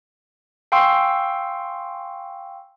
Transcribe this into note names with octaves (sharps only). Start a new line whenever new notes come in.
F5 G5 G#5 C6 C#6 E6